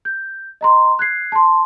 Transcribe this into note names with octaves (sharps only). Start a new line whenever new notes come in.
G6
D#5 A#5 C6
F#6 G#6 C7
A5 C6